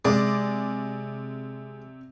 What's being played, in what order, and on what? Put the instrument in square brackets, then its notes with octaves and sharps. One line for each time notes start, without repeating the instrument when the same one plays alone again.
[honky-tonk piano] C3 D5 D6 [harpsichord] G#3